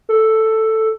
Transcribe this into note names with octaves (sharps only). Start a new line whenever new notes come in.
A4